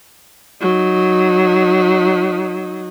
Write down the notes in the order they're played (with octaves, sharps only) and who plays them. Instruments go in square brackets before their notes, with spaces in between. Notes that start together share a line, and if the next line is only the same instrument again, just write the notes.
[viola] F#3 D#4